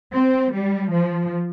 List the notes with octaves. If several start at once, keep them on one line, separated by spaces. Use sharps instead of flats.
C4
G3
F3